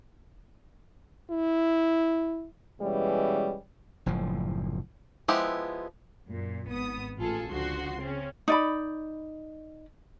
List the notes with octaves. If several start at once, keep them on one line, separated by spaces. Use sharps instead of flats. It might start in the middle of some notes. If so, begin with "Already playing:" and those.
E4
B2 E3 G3 G#3 C#4
F#1 A2 F3
F3 G#3 B3 E4 G4
F#2 A#2
G#1 B3 D#6
A1 F4 G#4 A4
C#2 D3 F3 F#4 C6
C#3 C4 C#4
D#4 D5 B5